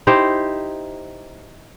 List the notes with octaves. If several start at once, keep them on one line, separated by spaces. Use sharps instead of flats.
D#4 E4 G4 C5